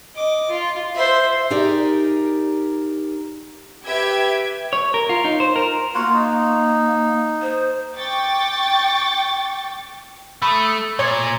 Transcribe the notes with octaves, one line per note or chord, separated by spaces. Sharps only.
D#5 D6
F4
C5 E5
D#4 G4 G#4 A#4 D5
G4 B4 E5 G#6 D7
C#5
A#4
F4
D#4
C5
A#4
A#3 F4 F#4 F#5
D#4
C5
G5 C#6 D6 A6
A3 B5 D#6
A#2 C#5